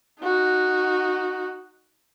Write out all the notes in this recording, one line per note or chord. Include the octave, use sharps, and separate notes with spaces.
D#4 F#4